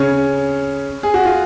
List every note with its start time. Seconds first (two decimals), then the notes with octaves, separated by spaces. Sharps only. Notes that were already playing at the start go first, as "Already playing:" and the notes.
Already playing: C#3 C#4
1.03 G#4
1.14 F#4
1.25 F4